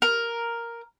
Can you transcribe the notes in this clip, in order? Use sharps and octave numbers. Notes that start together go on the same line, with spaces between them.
A#4